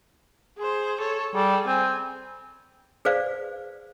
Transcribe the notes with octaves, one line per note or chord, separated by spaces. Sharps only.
G#4 C5
A4 C#5
G3 G#4 A4
C4 G#5
G#4 B4 C5 D5 F5